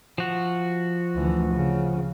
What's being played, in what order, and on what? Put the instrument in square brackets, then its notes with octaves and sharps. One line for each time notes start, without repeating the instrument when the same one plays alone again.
[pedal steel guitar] F3 F#4
[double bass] D2 E3
C#3